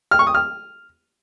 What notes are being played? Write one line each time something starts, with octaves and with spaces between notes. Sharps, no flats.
F6
C#6
D#6
F6